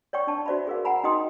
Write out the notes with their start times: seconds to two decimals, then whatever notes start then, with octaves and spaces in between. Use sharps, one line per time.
0.13 C#5 D5 G5 C#6
0.27 D4 A5
0.46 F#4 C5 D5 E5 B5
0.67 G#4 A#4 F5
0.85 F#5 G#5 A#5 B5
1.04 D#4 F#4 D#5 G5 C6 D#6